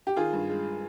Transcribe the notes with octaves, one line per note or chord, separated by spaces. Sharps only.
G4
D#3 F4 G#4
G2
G#3